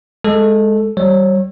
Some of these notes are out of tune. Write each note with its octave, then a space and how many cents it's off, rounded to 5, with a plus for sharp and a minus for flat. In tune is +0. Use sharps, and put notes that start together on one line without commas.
G#3 +0 A4 +0
G3 -25 C#5 -30